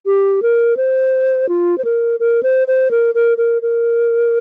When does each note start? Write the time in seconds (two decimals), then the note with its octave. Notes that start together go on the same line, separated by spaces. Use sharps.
0.06 G4
0.42 A#4
0.77 C5
1.49 F4
1.78 C5
1.84 A#4
2.20 A#4
2.43 C5
2.67 C5
2.91 A#4
3.15 A#4
3.38 A#4
3.62 A#4